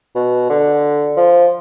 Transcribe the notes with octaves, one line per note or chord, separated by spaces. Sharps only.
B2
D3
F3